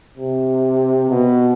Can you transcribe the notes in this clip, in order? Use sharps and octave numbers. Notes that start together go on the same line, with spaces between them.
C3
B2